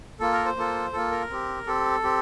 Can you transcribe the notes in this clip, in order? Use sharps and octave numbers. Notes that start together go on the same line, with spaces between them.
A#3 F4 A4
A#4
C5
A#3 F4 A4
A#3 F4 A4
A#4
C4 G4
C4 G4 A4
C4 G4